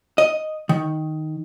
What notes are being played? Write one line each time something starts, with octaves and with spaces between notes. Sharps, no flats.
D#5
D#3